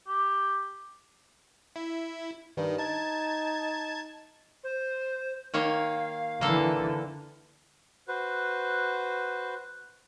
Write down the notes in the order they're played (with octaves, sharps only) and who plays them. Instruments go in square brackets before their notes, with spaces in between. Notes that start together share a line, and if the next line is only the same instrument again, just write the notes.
[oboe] G4
[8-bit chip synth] E4
[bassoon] G2 [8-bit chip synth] D#3
[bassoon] D#4 [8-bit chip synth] A5 G#6
[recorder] C5
[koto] D#3 A#3 C#5 [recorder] F5
[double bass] D3 E3 [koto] A#3 A4
[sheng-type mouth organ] F#4 B4 C5